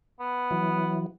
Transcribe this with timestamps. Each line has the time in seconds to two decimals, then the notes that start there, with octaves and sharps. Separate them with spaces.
0.20 B3
0.51 E3 F#3